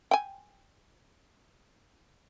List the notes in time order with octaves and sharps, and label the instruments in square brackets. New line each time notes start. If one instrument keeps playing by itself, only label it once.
[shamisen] G5 G#5